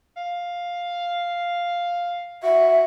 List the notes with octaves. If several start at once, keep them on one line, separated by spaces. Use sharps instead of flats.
F5
F#4 E5